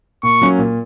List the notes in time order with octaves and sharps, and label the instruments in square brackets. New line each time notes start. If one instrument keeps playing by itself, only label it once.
[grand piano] A#2 [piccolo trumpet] C#6
[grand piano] F#3 A#3 C#4
A#2